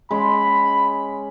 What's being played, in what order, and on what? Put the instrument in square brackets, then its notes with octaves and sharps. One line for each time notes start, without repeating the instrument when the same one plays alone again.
[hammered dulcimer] G#3 C#4 [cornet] B5